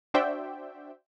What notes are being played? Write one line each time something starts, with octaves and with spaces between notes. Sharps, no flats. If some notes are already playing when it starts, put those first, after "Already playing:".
D4 F#4 C5 D5 E5 G5